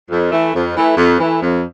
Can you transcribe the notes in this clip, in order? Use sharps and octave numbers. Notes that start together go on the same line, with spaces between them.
F2
E3 A3
F2
E3 A3
F2
E3 A3
F2